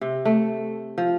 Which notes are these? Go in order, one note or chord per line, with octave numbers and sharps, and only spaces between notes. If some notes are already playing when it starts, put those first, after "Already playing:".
C3
A3
F3